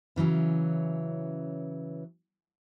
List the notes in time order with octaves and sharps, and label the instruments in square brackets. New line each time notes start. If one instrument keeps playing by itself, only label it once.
[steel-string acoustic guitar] C#3 E3 F#3 C#4